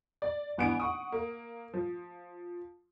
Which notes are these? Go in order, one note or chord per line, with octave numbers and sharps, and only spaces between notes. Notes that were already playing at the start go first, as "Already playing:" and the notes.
D5
G#1 E3 B3 D4 G#5 D7
F#5 C#6 D#6
A#3
F3